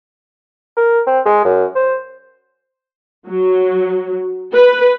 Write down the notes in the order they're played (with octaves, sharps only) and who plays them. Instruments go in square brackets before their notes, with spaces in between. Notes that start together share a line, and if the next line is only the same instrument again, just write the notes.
[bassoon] A#4
C4
G#3
F#2
C5
[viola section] F#3
B4